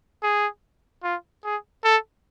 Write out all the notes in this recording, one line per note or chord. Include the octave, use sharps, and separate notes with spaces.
G#4
F4
G#4
A4